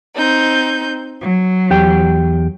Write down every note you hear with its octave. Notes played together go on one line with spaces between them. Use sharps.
C4 D#4 G6
F#3
E2 G4 G5